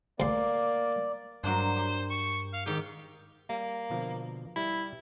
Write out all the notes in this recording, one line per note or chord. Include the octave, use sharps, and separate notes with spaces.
D2 A#3 D5 C6
G2 F#3 A#3 D4 C5
G4
C#6
F5
G#2 D#3 G4
G3 A#3
B2 D3 F3
G3 E4 B4 E5